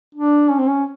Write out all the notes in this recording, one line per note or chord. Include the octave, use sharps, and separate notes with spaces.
D4
C#4
C4
C#4